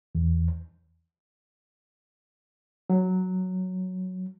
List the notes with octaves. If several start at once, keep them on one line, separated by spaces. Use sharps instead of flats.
E2
F#3